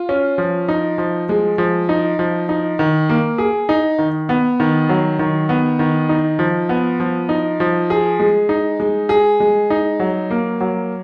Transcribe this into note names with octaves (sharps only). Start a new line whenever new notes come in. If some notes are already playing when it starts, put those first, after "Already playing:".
Already playing: F4
C#4
F3
D#4
F3
G#3
F3
D#4
F3
D#4
D#3
A#3
G#4
D#4
D#3
B3
D#3
F#3
D#3
B3
D#3
D#4
F3
B3
F3
D#4
F3
G#4
G#3
D#4
G#3
G#4
G#3
D#4
F#3
A#3
F#3